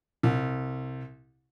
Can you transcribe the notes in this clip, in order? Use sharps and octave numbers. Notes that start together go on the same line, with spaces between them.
C2